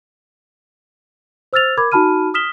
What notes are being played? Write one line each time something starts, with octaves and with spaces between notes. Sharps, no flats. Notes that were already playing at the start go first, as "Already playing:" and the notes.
C5 E6 F6 A6 F7
A#4 B5 D6 G#6
D#4 F#4 A5 B5 F6 D#7
D#6 F6 B6 E7 G7